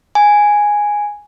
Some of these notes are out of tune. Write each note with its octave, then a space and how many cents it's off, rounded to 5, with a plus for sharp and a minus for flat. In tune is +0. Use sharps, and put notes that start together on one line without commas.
G#5 -5